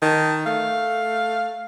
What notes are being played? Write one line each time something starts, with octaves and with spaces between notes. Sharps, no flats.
D#3 A5
A3 F5